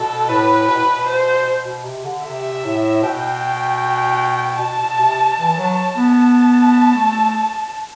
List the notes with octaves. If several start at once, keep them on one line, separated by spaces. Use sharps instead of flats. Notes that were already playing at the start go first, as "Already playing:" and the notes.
Already playing: B2 A4
A2 B4
B2 B4
A2
B2
C5
B2
B2
C3
D3
C3 E5
A2
B2 G5
B2 A5
B2
C3
E3
F#3
B3
A5
A3